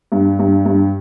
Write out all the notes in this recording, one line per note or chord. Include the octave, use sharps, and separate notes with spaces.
G2
G2
G2